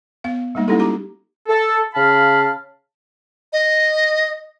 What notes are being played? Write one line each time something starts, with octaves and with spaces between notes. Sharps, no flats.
B3 F5
G3 G#3 A#3 D#4
A#3 C#4 D#4 E4 G4 A4
D#4 F#4 G4 A#5 D6
A4
C#3 F5 A5 B5 F6
D#5